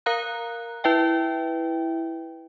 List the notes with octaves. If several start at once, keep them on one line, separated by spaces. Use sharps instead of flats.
A#4 F5 A#5 F#6
E4 B4 E5 G5